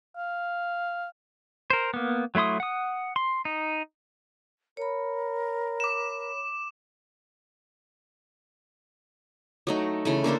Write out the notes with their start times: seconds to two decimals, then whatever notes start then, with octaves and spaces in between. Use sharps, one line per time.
0.16 F5
1.70 A#4 C5
1.94 A#3 B3
2.35 F#3 A3 E4 C6 D#6
2.60 F#5 D#6
3.16 C6
3.45 D#4
4.77 A#4 C#5 B5
5.80 D6 E7
9.67 F#3 A3 D#4
10.05 C#3 E3 A3
10.24 A#3 D4 A4 C5